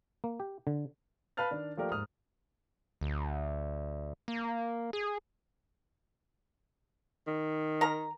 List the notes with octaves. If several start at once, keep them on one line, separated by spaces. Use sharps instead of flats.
A#3
G4
D3
B4 F5 A5 F6 A6
D#3 D4
F3 A3 A#3 G4 A#4 D5
G#2 D#6 F6
D2
A#3
G#4
D#3
A#4 A#5